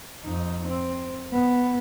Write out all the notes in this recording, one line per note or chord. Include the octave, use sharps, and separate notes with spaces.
F2 D#4
C4
B3